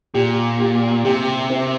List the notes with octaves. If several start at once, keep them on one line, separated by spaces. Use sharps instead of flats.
A#2 G4
G4
C3 G4
C4